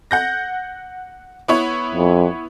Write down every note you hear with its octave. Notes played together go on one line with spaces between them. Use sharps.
F#5 G6 A#6
B3 E4 C#5
F2